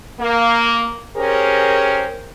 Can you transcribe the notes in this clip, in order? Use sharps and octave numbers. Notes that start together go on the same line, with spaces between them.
A#3
C#4 G4 G#4 A#4 C5